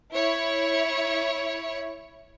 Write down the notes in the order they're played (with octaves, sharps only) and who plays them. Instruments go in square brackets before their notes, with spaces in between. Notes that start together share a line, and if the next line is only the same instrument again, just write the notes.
[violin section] E4 C#5